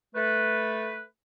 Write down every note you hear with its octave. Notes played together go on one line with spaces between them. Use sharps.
A3 B4